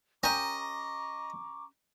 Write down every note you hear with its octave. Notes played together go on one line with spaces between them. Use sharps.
C#4 G4 A#4 D#5 A#5 C#6 D6